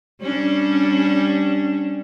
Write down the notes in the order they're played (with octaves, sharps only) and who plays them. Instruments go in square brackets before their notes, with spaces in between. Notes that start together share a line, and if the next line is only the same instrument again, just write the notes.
[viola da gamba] G3 C#4 D4